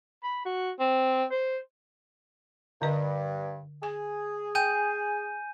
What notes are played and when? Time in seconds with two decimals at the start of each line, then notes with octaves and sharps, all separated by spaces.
0.23 B5
0.45 F#4
0.79 C4
1.31 C5
2.82 G2 D3 D#5
3.83 G#4 G#5
4.55 G5 G#5 G6 D#7